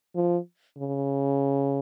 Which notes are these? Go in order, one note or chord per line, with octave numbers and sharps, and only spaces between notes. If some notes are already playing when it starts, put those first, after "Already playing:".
F3
C#3